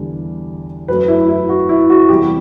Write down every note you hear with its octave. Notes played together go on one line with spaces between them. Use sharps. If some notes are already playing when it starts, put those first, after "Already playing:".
Already playing: E2 D3 G3
F#2 F#3 A3 B4
E4
E4
F#4
E4
F#4
E2 C3 G3 G4